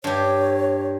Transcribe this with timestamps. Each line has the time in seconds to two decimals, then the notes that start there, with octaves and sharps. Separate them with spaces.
0.04 G2 G4 C#5